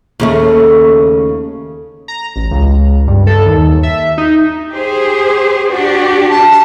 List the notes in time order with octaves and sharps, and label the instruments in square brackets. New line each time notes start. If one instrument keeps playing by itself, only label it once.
[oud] D#2 C#3 A3
[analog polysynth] A#5
A1
C#2
G2
A4
D#2
E5
D#4
[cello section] G4 G#4 C5
D4 F#4 G4
[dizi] A5